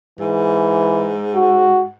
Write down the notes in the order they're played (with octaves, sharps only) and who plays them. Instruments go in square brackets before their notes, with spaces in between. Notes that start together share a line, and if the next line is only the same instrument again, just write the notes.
[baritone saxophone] G#2 [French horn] E3
[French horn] F#4